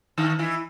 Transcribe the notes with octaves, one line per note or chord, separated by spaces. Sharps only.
D#3 D#4
E3 E4